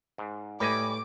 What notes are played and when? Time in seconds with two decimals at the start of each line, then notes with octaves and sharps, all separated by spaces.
0.18 G#2
0.60 A2 G3 B4 D#5 G#5 A#5 D6